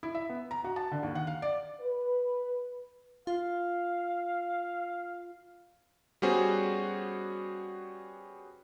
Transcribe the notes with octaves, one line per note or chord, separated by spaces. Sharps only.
E4
E5
B3
A#5
F#4
A5
D3
D#2
F#5
F5
D5
B4
F4 F5
G3 B3 C#4 F#4 G#4 C5